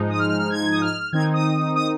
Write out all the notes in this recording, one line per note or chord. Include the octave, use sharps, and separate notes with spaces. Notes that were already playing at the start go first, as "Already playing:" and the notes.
Already playing: G#2 F3 G#3 D#4
D#6
F6
F6
F6
G#6
D#6
F6
D#3 C4 D#4 G#6
D#6
D#6